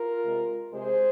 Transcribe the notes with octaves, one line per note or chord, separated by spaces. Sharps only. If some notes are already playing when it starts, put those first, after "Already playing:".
Already playing: F4 A#4
C3 G#3
C3 G#3 G#4 C5